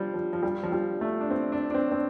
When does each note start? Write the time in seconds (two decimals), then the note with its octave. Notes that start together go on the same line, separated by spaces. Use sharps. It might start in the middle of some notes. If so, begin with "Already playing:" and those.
Already playing: F3 G3
0.14 F3
0.33 F3
0.43 G3
0.63 F3
0.72 G3
1.01 A3
1.21 D4
1.31 C4
1.52 D4
1.70 D4
1.74 C4
1.91 C4